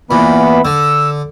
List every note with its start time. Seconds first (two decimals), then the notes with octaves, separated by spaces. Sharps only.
0.11 A#2 E3 B3 B5
0.65 D3 E6